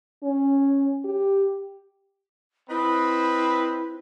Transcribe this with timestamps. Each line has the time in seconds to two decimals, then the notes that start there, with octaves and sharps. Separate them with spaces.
0.23 C#4
1.04 G4
2.70 C4 E4 B4 D#5 B5